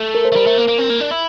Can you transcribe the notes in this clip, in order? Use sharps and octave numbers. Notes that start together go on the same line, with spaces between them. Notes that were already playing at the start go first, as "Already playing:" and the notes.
Already playing: A3
A#4
C5
A3
G3 A#4
A3
A#3
A#3
C4
A#3
D4
E4